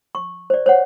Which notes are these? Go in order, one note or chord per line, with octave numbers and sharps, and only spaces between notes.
C#6
C5 D5
C5 C#5 F#5